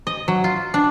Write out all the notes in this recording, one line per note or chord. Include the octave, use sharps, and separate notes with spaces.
D#5
F#3
F4
D4